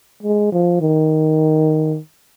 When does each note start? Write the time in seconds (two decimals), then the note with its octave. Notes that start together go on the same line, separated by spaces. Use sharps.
0.23 G#3
0.52 F3
0.81 D#3